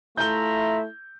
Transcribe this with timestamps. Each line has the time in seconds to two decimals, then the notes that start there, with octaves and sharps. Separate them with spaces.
0.17 A3 E4 F4 E5 A#5 G6 G7